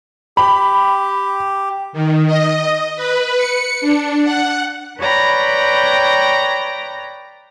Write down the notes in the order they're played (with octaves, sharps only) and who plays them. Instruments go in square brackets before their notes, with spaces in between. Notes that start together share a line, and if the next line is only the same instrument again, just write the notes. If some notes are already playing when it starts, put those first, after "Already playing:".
[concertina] G4 [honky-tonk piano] B5
[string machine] D#3
D#5
B4
C#7
D4
F#5
[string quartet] B4 C#5 D5 G5 A#5 B5